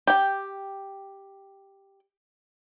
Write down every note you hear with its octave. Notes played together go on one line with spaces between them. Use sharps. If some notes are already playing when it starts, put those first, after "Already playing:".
G4 G5